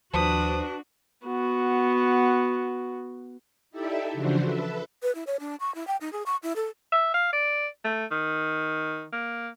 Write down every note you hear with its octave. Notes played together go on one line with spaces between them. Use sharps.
D#2 F3 D4 F#4 B4 C5 A5 D#6
B3 F#4
D#4 E4 G4 A4 D5 E5
C#3 E3 F3 D4 F#4 C5
A4 B4 E5
B4
E4
C#5
D4
C#6
E4
G5
D#4
G#4
C#6
E4
A4
E5
F5
D5
A3
D#3
A#3